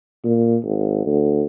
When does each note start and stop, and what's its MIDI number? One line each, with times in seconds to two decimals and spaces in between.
0.24 0.57 46
0.64 1.02 32
1.05 1.43 38